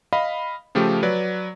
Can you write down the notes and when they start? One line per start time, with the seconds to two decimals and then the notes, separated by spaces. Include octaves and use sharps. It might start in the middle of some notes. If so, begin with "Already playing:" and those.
0.13 D#5 F5 B5
0.75 C#3 F3 A3 G4
1.03 F#3 B4 D5